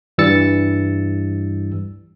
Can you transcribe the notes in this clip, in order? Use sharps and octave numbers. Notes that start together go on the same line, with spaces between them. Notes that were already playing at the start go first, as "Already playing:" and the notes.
G2 E3 G3 E6 A6 C#7